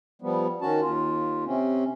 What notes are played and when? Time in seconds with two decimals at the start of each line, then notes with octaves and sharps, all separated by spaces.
0.22 F3 G3 B3
0.62 D#3 C#4 F#4 A5
0.81 D#2 F4
1.46 C3 C4 C#4